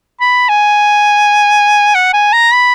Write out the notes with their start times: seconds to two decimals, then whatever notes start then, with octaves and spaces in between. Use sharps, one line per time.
0.21 B5
0.49 G#5
1.95 F#5
2.14 G#5
2.33 A#5
2.53 B5